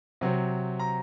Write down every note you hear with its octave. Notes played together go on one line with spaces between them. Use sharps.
C3 F#3 C4
A#5